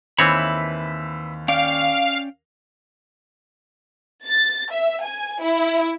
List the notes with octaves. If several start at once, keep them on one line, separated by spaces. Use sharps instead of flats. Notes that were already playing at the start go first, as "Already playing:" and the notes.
D#2 E3 C4 B4 C#5 E5 B5
C#4 D5 F5 G5
A6
E5
G#5
E4